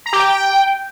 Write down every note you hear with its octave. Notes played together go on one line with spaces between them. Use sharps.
A#5
G4
G5